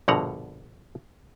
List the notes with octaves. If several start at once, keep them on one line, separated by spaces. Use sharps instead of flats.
A#1 G2 B2 D3 F#5 A#5